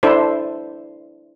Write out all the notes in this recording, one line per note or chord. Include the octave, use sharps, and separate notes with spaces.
D4 E4 A4 C5